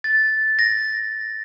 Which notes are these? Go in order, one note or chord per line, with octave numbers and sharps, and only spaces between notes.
A6
A#6